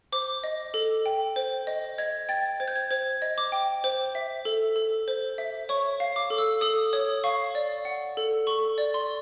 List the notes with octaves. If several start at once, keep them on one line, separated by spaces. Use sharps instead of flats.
C5 D6
D#5
A4
G5
C5
D#5
D#5 G#6
G5 A6
C5 G#6
G6
G#6
C5 G#6
D#5
D6
G5
C5
E5
A4
A4
C5
E5
C#5 C#6
F5
D6
A4
E6
A4 D#6
C#5 D#6
F5 C#6
D5
F#5
A4
A4 C#6
D5
C6